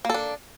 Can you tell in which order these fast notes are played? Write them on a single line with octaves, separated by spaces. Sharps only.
A#3 A4 D4